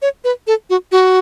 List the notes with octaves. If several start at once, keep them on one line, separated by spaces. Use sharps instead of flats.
C#5
B4
A4
F#4
F#4